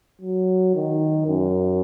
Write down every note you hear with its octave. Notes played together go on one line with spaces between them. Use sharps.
F#3
D#3
F#2